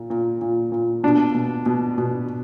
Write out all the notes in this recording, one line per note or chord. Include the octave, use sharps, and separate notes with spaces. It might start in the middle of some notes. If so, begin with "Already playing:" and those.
Already playing: A#2
A#2
A#2
A#2
B2 D4
B2
B2
B2